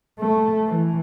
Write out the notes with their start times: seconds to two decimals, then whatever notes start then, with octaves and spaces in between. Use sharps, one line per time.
0.20 A3
0.68 E3